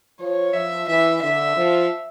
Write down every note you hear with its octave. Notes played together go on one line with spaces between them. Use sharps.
F3 C#5
F3 E5
E3 E5
D3 E5
F3